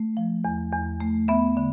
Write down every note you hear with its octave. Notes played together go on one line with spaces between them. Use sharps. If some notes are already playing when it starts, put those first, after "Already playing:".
Already playing: A3
F3
E2
E2
A3
B3 E5
D3